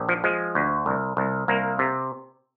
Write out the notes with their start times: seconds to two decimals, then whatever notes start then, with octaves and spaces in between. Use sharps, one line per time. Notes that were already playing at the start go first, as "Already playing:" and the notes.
Already playing: A#1
0.09 F3
0.24 F3 G#3
0.55 D2
0.86 C2
1.17 C2
1.48 C2 A#3
1.79 C3